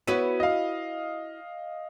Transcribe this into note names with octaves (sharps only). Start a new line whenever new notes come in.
B3 E4 F#4 B4 C#5 D#7
D#5 F5